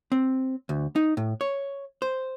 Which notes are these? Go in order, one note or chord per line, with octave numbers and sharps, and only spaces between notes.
C4
D2
D#4
A2
C#5
C5